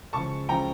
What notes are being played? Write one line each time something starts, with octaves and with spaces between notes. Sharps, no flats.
C#2 C#3 F3 A5 C#6
C#2 C#3 F3 G5 A#5